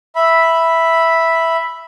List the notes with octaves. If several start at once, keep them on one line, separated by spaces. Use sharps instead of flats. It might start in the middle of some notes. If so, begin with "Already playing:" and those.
E5 B5